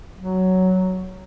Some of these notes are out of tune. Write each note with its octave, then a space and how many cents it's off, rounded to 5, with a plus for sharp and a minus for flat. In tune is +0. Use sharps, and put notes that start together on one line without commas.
F#3 +5